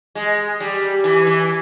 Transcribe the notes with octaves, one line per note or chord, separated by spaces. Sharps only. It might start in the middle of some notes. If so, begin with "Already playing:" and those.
G#3
G3
E3
E3